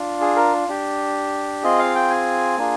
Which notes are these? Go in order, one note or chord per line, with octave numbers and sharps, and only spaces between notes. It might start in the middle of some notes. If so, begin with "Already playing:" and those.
Already playing: D4 F4
G#4
A#4
D4 G4
C4 F4 G#4 D#5
F5
G5
G#5
A#3 D4 F4 G#4